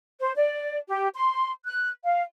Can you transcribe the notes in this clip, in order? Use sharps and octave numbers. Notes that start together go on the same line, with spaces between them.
C5
D5
G4
C6
F#6
F5